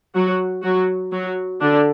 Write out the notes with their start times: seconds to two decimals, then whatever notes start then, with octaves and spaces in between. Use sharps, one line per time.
0.15 F#3 F#4
0.63 F#3 F#4
1.12 F#3 F#4
1.60 D3 D4